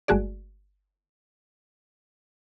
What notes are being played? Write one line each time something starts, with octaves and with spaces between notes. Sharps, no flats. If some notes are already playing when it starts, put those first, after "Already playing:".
G1 G#3 A3 F#4 G#4 D5